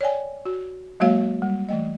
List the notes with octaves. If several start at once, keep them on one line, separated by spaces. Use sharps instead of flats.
C#5 D5 G5 G#5
F#4
F#3 G#3 A#3 F#4 C#5 F5
G3
E3 A3 D#5